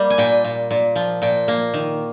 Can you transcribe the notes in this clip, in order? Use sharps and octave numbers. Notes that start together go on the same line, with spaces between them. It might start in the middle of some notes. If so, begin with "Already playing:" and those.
Already playing: G3 A#3
G#5
A#2 G5
A#2
A#2
F3
A#2 G5
A#3
D#3